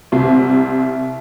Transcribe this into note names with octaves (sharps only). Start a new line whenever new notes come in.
C2 C3